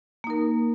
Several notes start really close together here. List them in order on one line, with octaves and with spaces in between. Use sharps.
A#3 D#4 A#4